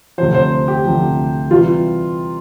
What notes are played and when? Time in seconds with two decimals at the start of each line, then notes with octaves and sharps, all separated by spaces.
0.18 D2 C3 F3 C5
0.35 C5
0.68 G4
0.85 D2 C3 F3
1.50 C3 E3 G3 F4